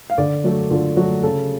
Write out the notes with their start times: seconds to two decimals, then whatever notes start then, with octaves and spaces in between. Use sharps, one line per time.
0.10 F5
0.18 D3 D5
0.44 F#3 A3
0.70 D3 F4
0.97 F#3 A3 F#4
1.23 C#3 A4